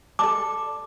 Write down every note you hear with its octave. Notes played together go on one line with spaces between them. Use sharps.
A4 D5 A5 D6